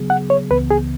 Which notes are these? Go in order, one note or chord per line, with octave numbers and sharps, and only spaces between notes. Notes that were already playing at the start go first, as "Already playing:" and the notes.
Already playing: C#3 F#3 B3 G#4
F#5
C#5
C#2 C#3 E3 B3 B4
G#4